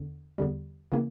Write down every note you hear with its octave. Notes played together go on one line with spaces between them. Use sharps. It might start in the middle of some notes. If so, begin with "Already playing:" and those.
Already playing: E2 D3
E2 D3 G3
C#3 E3 A#3